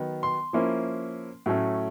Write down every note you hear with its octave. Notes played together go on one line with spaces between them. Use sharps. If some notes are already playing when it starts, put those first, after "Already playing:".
Already playing: D#3 F#3 B3
C6
F3 A#3 C#4 E4
A2 F#3 A3 C#4